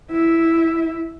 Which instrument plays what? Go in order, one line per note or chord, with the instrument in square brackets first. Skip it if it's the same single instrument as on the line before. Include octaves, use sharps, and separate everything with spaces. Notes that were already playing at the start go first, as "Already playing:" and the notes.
[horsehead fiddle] E4 E5